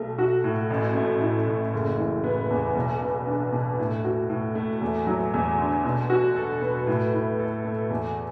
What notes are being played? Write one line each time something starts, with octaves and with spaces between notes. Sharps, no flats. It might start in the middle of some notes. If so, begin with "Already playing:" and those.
Already playing: B1 A3
F#4
A2
A1
A3
E4
A2
F#1
E3
B3
E2
B1
B3
D4
B2
A2
F#4
A2
A3
E2
F#3
E2
D3
B2
F#4
A4
B3
A2
E4
A4
A3
E2